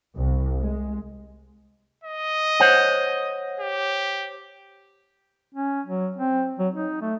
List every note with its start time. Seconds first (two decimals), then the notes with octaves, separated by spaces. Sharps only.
0.16 C2
0.61 G#3
2.04 D#5
2.60 C5 C#5 F#5
3.60 G4
5.55 C#4
5.87 F#3
6.17 C4
6.59 F#3
6.74 D#4
7.02 A3